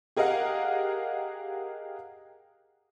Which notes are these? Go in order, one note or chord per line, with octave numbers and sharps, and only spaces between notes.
G4 G#4 A#4 D#5 F5 F#5